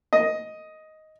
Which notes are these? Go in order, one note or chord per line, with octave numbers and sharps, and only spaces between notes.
D#5